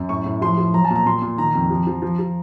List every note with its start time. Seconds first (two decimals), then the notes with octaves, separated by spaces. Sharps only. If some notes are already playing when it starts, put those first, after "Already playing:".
Already playing: F#2
0.09 A2 C#6
0.25 A2
0.42 F3 C6
0.58 F3
0.74 F#3 A#5
0.85 A5
0.90 A#2
0.96 A#5
1.06 A#2 C6
1.22 A#2
1.38 D#3 A#5
1.54 F2
1.71 F3
1.87 F3
2.02 F3
2.19 F3